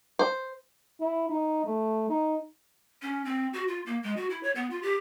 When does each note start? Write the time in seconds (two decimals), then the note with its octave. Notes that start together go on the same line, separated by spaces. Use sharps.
0.19 C5
1.00 E4
1.30 D#4
1.64 A3
2.10 D#4
3.02 C#4
3.25 C4
3.53 F#4
3.68 F4
3.86 A#3
4.03 G#3
4.17 F#4
4.30 E4
4.43 C#5
4.56 B3
4.70 F4
4.83 G4